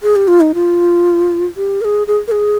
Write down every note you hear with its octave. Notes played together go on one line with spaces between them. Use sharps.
G#4
G4
F4
D#4
F4
G4
A#4
G#4
G#4
A#4
G#4